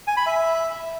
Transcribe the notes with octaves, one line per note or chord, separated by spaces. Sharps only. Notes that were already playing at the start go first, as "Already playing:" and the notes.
G#5
B5
E5